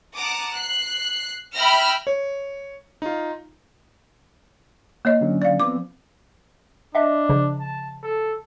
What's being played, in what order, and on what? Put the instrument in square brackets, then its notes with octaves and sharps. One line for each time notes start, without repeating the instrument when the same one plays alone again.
[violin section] F#5 A5 A#5 D6 D#6
F#6 C7
E5 G5 B5 F6 A#6
[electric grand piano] C#5
D#4 F4
[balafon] A#3 C#5 D#5
[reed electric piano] D3 F#3 C#4
[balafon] D5 F5
[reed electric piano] F3 B3 C4 [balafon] D6
[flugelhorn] D4 [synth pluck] D#5 E5
[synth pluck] C#3 F3
[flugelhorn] A5
A4